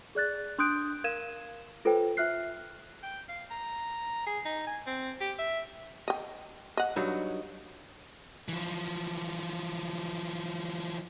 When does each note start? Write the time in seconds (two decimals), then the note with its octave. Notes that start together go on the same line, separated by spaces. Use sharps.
0.15 G#4 D5 F#6 A6
0.58 D4 C6 D#6 F#6 G6 D7
1.04 A#4 F5 G#6 D#7 E7
1.85 F4 A4 B4 C5 G5
2.17 F4 E5 F6 F#6 C7
3.03 G5
3.29 F5
3.51 A#5
4.26 G#4
4.46 D#4
4.67 G#5
4.87 C4
5.21 G4
5.39 E5
6.08 D#5 G5
6.77 D#5 F#5
6.96 G2 F#3 D#4
8.48 E3 F3